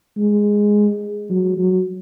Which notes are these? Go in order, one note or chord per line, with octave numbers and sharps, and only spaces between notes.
G#3
F#3
F#3